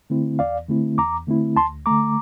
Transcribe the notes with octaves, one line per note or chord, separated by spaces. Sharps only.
D3 A3 C4 E4
E2 D5 F5
D3 A3 C4 E4
E2 A#5 D6
D3 A3 C4 E4
D2 A5 C6
D3 A3 A#5 D6